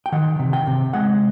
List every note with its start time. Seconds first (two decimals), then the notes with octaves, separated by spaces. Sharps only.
0.06 G5
0.12 D#3 F#5
0.39 C3
0.53 G5
0.67 C3
0.93 G#3 F#5